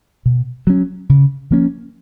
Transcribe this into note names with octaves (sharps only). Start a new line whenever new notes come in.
B2
F#3 C#4
C#3
F3 A#3 C#4